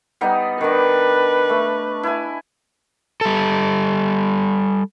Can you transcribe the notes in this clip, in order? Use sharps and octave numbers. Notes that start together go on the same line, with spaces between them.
G3 B3 D#4
D#3 D4 B4
A3
E4 G#5
G3 A4